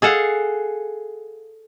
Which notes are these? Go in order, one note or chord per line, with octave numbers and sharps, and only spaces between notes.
G#4 A4 F5 F#5